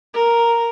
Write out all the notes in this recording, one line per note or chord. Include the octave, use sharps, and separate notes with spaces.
A#4